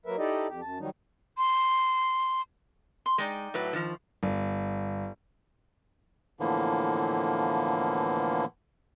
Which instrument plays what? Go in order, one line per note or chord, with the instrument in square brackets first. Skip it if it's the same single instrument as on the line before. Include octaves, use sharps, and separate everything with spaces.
[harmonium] F#3 A#3 A#4 B4 E5
D#4 E4 G4 A4 D5 D#5
F2 G4
F#2 A5
D#3 F#3 G3 D#4
[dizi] C6
[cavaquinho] C6
[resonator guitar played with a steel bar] G#3 [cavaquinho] D#4 D5 G5
[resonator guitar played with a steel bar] A2 F#3 B4
D#3 F3
[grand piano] G1
[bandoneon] A2 D3 E3 F3 A#3 B3